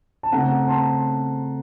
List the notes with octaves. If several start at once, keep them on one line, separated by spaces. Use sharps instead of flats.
A5
C#3 A3 C4 F#5 A#5
A5 C6